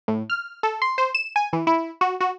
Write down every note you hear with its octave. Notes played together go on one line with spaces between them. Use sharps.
A2
F6
A4
C6
C5
E7
G#5
E3
E4
F#4
F#4